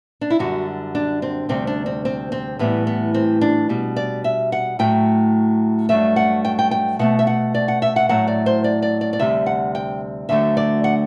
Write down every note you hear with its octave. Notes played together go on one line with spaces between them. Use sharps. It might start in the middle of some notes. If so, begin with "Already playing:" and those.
D4
E4
F#2 D3 G3 F#4
D4
C4
D2 C3 G3 C4
D4
C4
C4
C4
A2 E3 G3 B3
B3
C4
D4
B2 G3
D5
E5
F#5
A2 F#3 A3 G5
G2 F#3 A3 E5
F#5
G5
G5
G5
B2 A3 F#5
E5
F#5
D5
F#5
E5
F#5
A2 F#3 A3 F#5
D5
C5
D5
D5
D5
D5
D2 C3 G3 E5
F#5
G5
D2 D3 F#3 A3 E5
D5
F#5